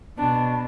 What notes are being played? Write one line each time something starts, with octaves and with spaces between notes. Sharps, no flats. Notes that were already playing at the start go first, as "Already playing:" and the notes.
B2 D4